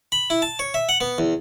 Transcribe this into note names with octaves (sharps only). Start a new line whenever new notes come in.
B5
E4
A5
C#5
E5
F#5
B3
E2